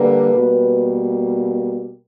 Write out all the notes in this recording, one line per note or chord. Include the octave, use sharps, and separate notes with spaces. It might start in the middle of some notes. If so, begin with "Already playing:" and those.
Already playing: D3 G3 A#3 B4
B2 G3 A#3